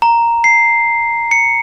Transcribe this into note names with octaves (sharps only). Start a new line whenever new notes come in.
A#5
C7
C#7